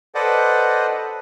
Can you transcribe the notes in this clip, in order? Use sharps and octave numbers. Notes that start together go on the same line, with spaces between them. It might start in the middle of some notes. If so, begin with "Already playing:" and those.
A4 B4 C5 D5 D#5 F#5